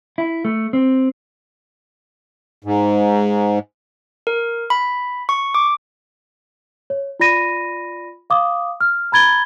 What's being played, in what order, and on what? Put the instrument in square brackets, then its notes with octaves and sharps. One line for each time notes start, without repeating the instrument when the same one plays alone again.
[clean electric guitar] E4
A3
C4
[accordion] G#2
[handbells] A#4
B5
C#6
D6
[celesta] C#5
F4 D5 B5 A#6 D#7
F5 D6 D#6
F6
A#5 B5 G#6 A6 G7